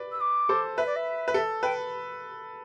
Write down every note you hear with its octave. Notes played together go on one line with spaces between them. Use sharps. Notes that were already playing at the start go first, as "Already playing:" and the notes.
Already playing: B4 D5
E6
D6
A4 C5
B4 E5
D5
E5
B4
A4
B4 G5